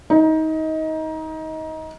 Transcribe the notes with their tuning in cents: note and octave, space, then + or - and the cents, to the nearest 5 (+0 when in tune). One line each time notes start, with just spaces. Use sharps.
D#4 +25